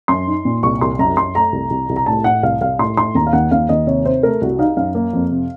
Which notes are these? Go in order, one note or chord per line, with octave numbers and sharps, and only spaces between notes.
F#2 C6
D#4
A#2
C2 C#6
C2 C6
F#2 A#5
F#2 C6
A3 A#5
C2
C2
C2
A#5
A2 A5
A2 F#5
C2 F5
C2 F5
A2 C6
A2 C6
D#2 A#5
F5
D#2 F#5
D#2 F5
D#2 D#5
C3 C#5
C3 C5
A3 A#4
C2 F#4
D#4 F5
F#2 F5
A#3
F2
C3